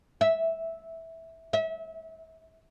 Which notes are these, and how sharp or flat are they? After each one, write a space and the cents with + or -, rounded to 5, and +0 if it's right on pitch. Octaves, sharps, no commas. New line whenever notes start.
E5 -10
E5 -30